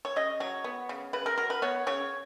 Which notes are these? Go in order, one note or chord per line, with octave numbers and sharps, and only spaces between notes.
C#5
C#3 D#5
F#3 C#5
B3
C#3
C#3 B4
A#4
F#3 A#4
B4
B3 C#5
C#3 C#5